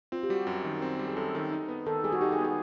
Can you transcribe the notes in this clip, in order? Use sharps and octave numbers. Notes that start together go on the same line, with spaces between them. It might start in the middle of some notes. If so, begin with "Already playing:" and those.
C4 F4
G4
G3 F#4
F#2
D#3
C4
G3
G#4
F#2 A4
D#3
D#4
B3
D#3 A4
G3 G#4
F#4
D#4 G4
G#4
B3
G#4